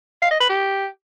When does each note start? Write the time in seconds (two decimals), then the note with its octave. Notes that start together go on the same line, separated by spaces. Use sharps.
0.22 F5
0.31 D#5
0.40 B4
0.49 G4